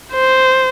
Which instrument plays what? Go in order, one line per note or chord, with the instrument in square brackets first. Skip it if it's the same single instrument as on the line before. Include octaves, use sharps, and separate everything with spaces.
[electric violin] C5